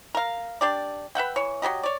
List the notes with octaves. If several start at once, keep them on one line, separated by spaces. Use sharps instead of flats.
A#4 F5
D4 G4 D5
B4 E5 F#5 G5
E3 C#5
F#3 B3 G4 D#5
C#5 D5